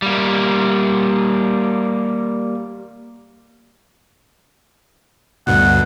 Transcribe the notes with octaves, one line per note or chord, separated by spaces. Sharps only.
G3 A#3
D2 G2 B2 F#5